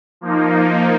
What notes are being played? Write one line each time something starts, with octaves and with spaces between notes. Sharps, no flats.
F3 A#3 D#4